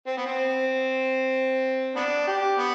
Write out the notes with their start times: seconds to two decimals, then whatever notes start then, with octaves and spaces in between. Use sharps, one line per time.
0.07 C4
0.17 B3
0.26 C4
1.96 B3 D4
2.27 G4
2.58 B3